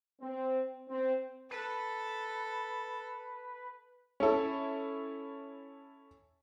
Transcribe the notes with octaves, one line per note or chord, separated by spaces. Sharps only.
C4
C4
A4 B4
C#4 E4 A4